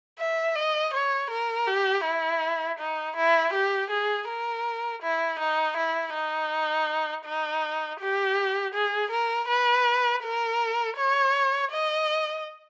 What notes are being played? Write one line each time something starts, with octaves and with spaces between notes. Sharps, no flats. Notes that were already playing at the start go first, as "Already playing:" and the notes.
E5
D#5
C#5
A#4
G4
E4
D#4
E4
G4
G#4
A#4
E4
D#4
E4
D#4
D#4
G4
G#4
A#4
B4
A#4
C#5
D#5